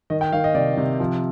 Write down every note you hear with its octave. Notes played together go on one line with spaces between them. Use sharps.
D#3 D#5
G5
D#3 F5
D#5
C3 D5
C3
F3